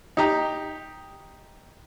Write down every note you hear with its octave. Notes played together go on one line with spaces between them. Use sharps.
D#4 G4 A#5